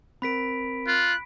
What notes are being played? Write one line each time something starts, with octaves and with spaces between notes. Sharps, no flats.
C4 A#4 B5 B6 D7
F4 F#6